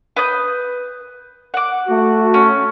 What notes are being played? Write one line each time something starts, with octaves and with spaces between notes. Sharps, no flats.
B4 D#6 G6
F#5 D6
A3 F#4
C#4